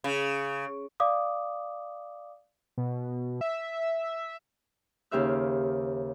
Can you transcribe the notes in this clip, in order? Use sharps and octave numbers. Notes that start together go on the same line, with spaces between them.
C#3
D5 F5 D6 D#6
B2
E5
D#2 C#3 G4 C5 E5 F6